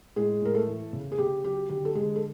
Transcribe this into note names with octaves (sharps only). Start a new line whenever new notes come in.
A2 G#3 G#4
A2 A#4
A3 A4
E3
C#3
G#4
C#3 G4
F#3 G4
D3 G4
A4
D3 G#3 G#4
A4